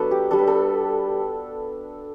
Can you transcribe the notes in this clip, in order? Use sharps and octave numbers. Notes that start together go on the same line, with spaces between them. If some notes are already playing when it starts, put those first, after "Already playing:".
Already playing: F#3 B3 D4 A4 B4
G4
G3 D4 A4
B4
A4